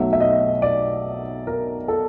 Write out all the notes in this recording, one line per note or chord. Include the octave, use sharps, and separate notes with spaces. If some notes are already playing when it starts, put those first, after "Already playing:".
Already playing: B1 B2 F#3 A3 E5
E5
D#5
D5
A#4
A4